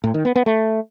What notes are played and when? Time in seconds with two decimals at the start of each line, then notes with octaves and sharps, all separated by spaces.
0.04 A2
0.14 D#3
0.25 B3
0.36 B3
0.46 A3